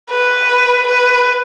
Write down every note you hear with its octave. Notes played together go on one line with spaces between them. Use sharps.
B4
B4